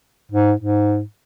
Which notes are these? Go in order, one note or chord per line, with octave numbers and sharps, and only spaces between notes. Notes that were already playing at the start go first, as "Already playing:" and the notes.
G#2
G#2